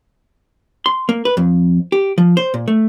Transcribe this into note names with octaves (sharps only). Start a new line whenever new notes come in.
C6
A#3
B4
F2
G4
F3
C5
A#2
A3